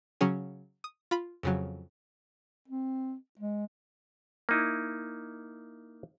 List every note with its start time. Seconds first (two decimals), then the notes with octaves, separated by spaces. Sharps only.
0.21 C#3 F#3 C#4 G#4
0.84 D#6
1.11 F4 B5
1.43 F2 C#3 F#3
2.68 C4
3.39 G#3
4.49 A#3 D#4 E4